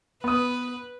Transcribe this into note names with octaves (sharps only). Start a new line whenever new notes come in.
B3 B4 D#6